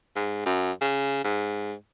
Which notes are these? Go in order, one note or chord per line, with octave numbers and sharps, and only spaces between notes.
G#2
F#2
C#3
G#2